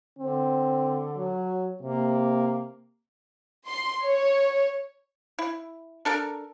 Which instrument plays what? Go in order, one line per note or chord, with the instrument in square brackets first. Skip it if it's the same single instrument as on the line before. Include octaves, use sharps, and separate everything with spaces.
[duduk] D3 [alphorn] C4
[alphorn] F#3
[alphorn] C3 [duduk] A#3
[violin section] C6
C#5
[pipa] E4
D4 A4 A#4